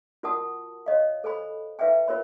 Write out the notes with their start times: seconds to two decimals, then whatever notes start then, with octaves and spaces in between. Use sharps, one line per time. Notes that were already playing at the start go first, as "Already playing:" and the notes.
0.23 F4 F#4 A#4 F#5 A5 D#6
0.86 C#5 D#5 F5
1.24 A4 C5 G#5 B5
1.79 E4 B4 E5 F5 G5 G#5
2.08 F4 A#4 C#5 B5